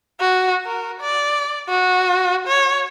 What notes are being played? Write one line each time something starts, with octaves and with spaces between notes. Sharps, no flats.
F#4
A#4
D5
F#4
C#5